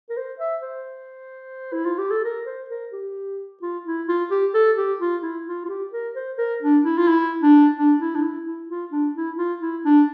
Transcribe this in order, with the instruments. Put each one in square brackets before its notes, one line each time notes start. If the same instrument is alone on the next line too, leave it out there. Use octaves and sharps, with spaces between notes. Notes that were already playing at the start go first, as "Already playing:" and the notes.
[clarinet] A#4
C5
E5
C5
E4
F4
G4
A4
A#4
C5
A#4
G4
F4
E4
F4
G4
A4
G4
F4
E4
F4
F4
G4
A#4
C5
A#4
D4
E4
F4
E4
D4
D4
E4
D4
E4
E4
F4
D4
E4
F4
E4
D4